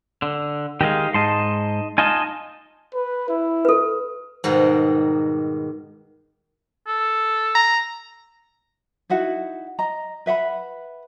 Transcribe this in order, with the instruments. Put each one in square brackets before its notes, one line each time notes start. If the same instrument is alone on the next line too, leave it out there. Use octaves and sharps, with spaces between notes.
[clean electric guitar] D3
[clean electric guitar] D#3 G#3 [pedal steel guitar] G4 D#5 F5
[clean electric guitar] G#2 [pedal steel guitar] D#5 A5 C6
[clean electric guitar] D#4 F4 D#5 [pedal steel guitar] G#5 A5
[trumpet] B4
E4
[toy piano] A4 B4
[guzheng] G#2 B2 D#3 G3
[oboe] A4
[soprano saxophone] A#5
[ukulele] D#4 E4 F#4 F#5
D#5 A#5
B4 E5 F#5 B5